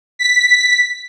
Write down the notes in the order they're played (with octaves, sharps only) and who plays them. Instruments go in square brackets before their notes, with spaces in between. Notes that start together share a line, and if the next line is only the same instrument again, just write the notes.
[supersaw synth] B6